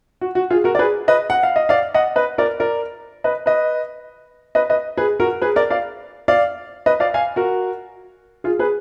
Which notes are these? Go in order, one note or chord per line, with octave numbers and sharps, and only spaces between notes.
F#4
F#4
F4 G#4
F#4 A#4
D5
G#4 B4
B4 D#5
F#5
F5
D#5
D5 F5
D#5 F#5
B4 D#5
A#4 D5
A#4 D5
B4 D#5
B4 D#5
B4 D#5
B4 D#5
G#4 B4
F#4 A#4
G#4 B4
A#4 D5
D5 F5
D5 F5
B4 D#5
D5 F5
F5 G#5
F#4 A#4
F4 G#4
G#4 B4